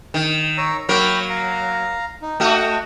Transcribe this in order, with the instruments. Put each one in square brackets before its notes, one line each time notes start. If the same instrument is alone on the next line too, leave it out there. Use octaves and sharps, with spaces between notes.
[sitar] D#3
[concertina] C#5 A#5 E6
[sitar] F#3 A#3 A#4 [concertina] C#5 G5 B5
[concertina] F5 A#5
D#4
[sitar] A3 F#4 [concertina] D#5 G5